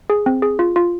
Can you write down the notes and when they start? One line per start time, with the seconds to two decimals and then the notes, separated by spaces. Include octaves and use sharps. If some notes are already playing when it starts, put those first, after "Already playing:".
0.10 G#4
0.26 C4
0.42 G#4
0.59 F4
0.76 F4